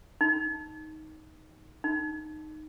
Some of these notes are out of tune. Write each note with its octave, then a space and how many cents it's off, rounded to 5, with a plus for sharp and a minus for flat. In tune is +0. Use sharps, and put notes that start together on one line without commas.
D#4 +5
D#4 -10